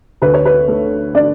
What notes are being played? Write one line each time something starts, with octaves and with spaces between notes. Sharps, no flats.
D2 B4
C#5
B4
A3
D4 D5